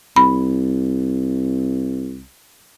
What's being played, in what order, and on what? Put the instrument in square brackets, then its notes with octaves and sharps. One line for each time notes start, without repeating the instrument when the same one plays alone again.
[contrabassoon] C2 [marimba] B5